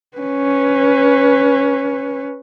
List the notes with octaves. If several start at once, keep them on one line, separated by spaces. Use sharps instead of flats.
C#4 B4